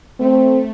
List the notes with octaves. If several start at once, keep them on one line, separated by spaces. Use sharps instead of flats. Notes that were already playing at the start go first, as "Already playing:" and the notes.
A3 C4